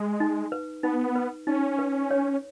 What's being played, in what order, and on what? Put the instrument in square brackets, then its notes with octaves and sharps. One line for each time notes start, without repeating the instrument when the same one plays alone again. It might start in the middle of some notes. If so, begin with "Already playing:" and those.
Already playing: [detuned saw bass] G#3
[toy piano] D#4
B4
[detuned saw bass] B3 [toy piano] D#4
[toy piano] B4
[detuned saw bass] C#4 [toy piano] D#4
[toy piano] B4
C#5